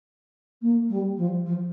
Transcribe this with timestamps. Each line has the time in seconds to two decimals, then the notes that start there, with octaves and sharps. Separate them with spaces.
0.62 A#3
0.89 G3
1.17 F3
1.46 F3